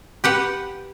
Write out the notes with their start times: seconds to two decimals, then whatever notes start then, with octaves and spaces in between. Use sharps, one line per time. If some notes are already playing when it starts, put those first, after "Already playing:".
0.24 G4 B4 F#5